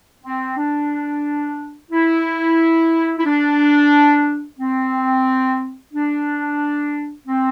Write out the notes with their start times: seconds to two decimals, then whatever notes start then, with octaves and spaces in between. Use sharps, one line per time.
0.24 C4
0.57 D4
1.91 E4
3.18 E4
3.25 D4
4.59 C4
5.93 D4
7.27 C4